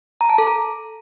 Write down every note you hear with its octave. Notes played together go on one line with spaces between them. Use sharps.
A#5
A5
A4
A#5